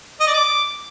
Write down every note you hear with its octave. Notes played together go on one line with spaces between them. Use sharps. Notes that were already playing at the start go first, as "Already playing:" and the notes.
D#5
D5
D6